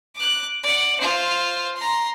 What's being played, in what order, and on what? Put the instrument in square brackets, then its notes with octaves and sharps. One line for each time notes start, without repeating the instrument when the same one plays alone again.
[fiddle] D6 F#6
D5 F#5
F4 C5
A#5 C6